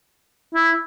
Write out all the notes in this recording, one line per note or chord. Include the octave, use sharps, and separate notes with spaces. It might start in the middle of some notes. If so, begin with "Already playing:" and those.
E4